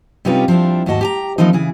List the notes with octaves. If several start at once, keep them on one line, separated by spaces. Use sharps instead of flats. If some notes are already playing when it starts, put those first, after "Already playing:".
C3 G3 C#4 D#4 F4 B4
F3 C4 D4 E4
D#2 G#2 F#4 D#5 A5
G4 G#5 A#5
E3 F3 A#3 C4 D#4
C#3 E3 G#4